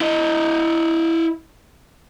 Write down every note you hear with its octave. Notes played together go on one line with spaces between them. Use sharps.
E4 D#5